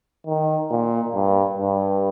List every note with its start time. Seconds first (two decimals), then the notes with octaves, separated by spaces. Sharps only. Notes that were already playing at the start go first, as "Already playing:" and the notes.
0.27 D#3
0.71 A#2
1.15 G2
1.58 G2